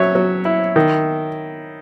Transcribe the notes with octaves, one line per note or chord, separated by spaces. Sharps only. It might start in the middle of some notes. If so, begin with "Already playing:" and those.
Already playing: F#3 C#4 C#5 E5
F#3
E4
D#3